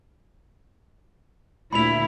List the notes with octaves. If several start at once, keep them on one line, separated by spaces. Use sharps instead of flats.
D2 A#2 E4 B5 F7